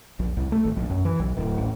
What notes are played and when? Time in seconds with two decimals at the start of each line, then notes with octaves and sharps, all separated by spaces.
0.19 A#1
0.37 C2
0.52 A3
0.65 G#1
0.76 A#1
0.90 F#2
1.05 E3
1.20 B1
1.37 D1
1.58 A1